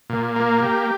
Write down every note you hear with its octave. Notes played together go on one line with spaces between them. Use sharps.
A#2
A#3
G4